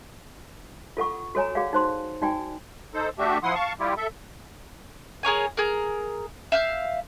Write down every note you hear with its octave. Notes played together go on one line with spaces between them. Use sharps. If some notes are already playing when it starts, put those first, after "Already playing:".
F4 A4 F#5 C#6
F#4 A4 C#5 G#5 A#5
F#4 G#4 D5 F5 F#5
D#4 C5 C6
D#4 F#4 D5 G5 G#5
D#4 A4 C5
A3 D4 F#4 G4 E5
F3 E4 F#5 C6 D#6
F5 A5 C#6
G3 E4 F4 G4
A4 E5
G#4 A#4 C#5 G#5
G#4 A#4
E5 F5 G6